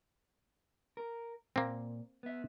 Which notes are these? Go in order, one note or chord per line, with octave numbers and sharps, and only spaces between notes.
A#4
A#2 A#3 C4
B3 E5